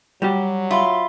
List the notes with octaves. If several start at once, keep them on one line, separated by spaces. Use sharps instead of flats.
F#3 G3 F#4 G4
F4 E5 B5 C6